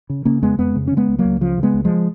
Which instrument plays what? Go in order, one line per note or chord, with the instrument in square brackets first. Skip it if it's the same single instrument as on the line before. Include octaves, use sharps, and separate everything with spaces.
[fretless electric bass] C#3
C#3 A#3 C#4
F2 G#3 B3
F2 G#3 B3
C#3
C#3 C#4
G#3 B3
C#2
F#3 A#3
C#2
C#3 F3
C#3
G#3 B3
C#2
F3 G#3